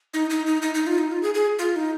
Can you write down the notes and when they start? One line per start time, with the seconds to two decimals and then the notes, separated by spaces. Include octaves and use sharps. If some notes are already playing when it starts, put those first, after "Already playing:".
0.14 D#4
0.30 D#4
0.46 D#4
0.62 D#4
0.75 D#4
0.87 F4
0.98 D#4
1.11 F4
1.23 G#4
1.34 G#4
1.59 F4
1.76 D#4